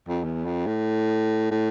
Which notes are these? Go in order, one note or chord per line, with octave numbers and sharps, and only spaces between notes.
F2
E2
F2
A2
A2